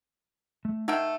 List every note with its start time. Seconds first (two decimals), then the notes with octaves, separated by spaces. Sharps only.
0.65 A3
0.88 A3 D#4 A#4 D#5 F#5 G5